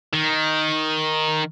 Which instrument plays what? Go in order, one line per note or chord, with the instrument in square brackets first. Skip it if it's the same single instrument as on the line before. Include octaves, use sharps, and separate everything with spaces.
[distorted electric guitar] D#3